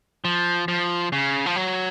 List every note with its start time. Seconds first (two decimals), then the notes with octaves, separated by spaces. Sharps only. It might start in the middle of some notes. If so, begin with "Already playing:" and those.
0.25 F3
0.68 F3
1.12 C#3
1.46 F3
1.56 F#3